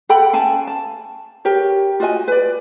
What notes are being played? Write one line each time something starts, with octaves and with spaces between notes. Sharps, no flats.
A4 F#5 G5 B5
C#4 F5 G#5 A5
A5
G4 A#4 C#5
F4 F#4 D#5 G#5
B4 D5